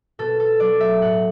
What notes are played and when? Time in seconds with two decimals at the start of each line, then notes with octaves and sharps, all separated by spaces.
0.19 B2 A4
0.40 A4
0.60 F#3 D5
0.81 E5
1.02 A2 F#5